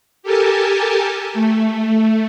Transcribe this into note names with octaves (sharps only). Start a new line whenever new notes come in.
G4 A4 A#4 G#5 A5
A3